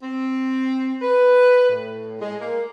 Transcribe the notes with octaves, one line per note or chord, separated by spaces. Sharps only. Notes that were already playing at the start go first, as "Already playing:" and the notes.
C4
B4
A2
G#3
A#3